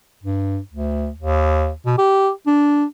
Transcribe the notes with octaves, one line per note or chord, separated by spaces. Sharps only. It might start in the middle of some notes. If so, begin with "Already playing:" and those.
G2
D2
D#2
B2
G4
D4